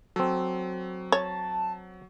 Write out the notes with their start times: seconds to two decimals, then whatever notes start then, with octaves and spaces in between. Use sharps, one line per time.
0.16 F#3 C4 A4
1.12 C#5 A5